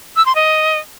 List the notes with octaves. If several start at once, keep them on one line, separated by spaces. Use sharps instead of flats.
E6
C6
D#5